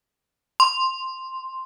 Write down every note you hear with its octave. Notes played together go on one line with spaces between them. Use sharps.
C6